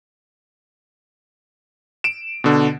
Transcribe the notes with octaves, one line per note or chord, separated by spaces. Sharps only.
D7 E7
B2 D3